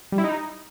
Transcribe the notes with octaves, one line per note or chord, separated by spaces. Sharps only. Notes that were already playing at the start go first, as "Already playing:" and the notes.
G3
E4
D#4